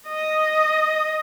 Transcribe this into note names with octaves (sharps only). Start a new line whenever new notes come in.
D#5